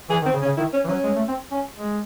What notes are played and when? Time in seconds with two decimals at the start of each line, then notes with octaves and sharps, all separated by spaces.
0.09 E3 G#4
0.22 D#3
0.26 C4
0.33 C#3
0.42 C#4
0.45 C#3
0.57 D#3 E4
0.73 C#4
0.84 E3
0.89 F#3 C#4
1.04 G#3
1.16 A3
1.28 C4
1.51 C#4
1.76 G#3